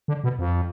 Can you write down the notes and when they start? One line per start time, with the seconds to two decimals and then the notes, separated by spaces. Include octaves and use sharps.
0.08 D3
0.24 B2
0.39 F2